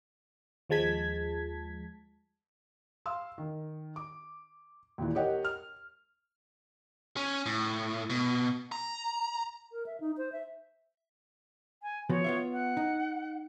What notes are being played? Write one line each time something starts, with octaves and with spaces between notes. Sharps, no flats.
D#2 F3 G#3 A5 G#6 B6
F5 C6 E6
D#3
D6
D#2 A#2 E3
G4 A#4 C#5 D#5 F#5 G5
F6
C#4
A2
B2
A#5
A#4
E5
D#4
C5
E5
G#5
F3 B3 F#4 C#5
B3 F4 E5
F#5
D#4